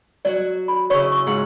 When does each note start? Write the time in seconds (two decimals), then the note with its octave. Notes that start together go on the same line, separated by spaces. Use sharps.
0.25 F#3 F#4 D5
0.68 B5
0.90 C#3 E4 C#5 C#6
1.12 C#6
1.26 G#2 F4 F#5